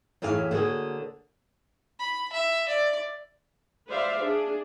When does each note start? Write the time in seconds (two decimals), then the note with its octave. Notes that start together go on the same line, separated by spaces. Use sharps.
0.22 F#2 A2 E3 G#4 F5
0.51 D3 A#3 F#4 G#4
1.99 B5
2.33 E5
2.68 D5
3.88 B4 C5 D5 E5 F5
4.21 D4 G#4